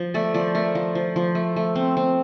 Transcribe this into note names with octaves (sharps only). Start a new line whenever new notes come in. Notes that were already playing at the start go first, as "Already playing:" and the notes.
Already playing: F3
A3 D5
F3 D5
A3 A#4
F3
F3
F3
A3
A3
C4
C4